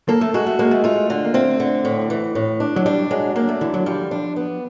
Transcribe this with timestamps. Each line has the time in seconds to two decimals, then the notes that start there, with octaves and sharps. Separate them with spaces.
0.08 A#3 A4
0.21 A3
0.34 G#3 F#4
0.46 A3
0.59 G#3 A#3
0.71 A3
0.84 A3 F4
1.10 D3
1.25 A#3
1.34 A3 C4
1.60 D3
1.85 A2
2.10 E3
2.35 A2
2.60 D4
2.76 F#3
2.86 G3 D4
3.11 F#3 G#3
3.36 A#3 D4
3.49 A3
3.61 D3 E3
3.74 F#3
3.86 F3 G3
4.11 D4
4.36 B3